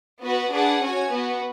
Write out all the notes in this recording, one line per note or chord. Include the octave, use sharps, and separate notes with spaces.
B3 F#4 B4
D4 G#4 B4 F#5 A5
C#4 F#4 C#5 G#5
B3 F#4 B4